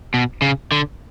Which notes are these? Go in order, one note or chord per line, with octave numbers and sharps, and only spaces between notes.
B2
C#3
D3